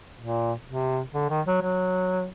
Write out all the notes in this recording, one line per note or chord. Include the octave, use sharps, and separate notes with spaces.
A#2
C3
D3
D#3
F#3
F#3